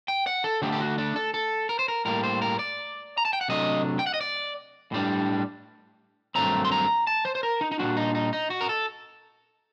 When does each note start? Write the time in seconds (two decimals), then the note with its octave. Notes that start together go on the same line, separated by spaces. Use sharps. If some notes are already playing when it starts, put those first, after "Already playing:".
0.08 G5
0.27 F#5
0.44 A4
0.62 D3 A3 D4 G4
0.72 G4
0.80 F#4
0.98 D4
1.16 A4
1.34 A4
1.69 A#4
1.79 C5
1.88 A#4
2.05 A2 G3 A#3 A#4
2.23 C5
2.42 A#4
2.59 D5
3.18 A#5
3.25 A5
3.33 G5
3.41 F#5
3.48 C3 F#3 A3 D4 D#5
3.99 G5
4.06 F#5
4.14 D#5
4.21 D5
4.92 A2 G3 D4
6.35 G2 D#3 F#3 A3 C4 A#5
6.65 C6
6.72 A#5
7.07 A5
7.25 C5
7.35 C5
7.43 A#4
7.61 D#4
7.72 D#4
7.79 A#2 G3 A#3 D4 F#4
7.97 D#4
8.15 D#4
8.33 D#4
8.50 F#4
8.61 A#4
8.69 A4